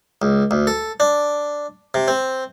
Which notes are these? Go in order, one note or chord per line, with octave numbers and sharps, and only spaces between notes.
C#2
D2
A4
D4
C3
C4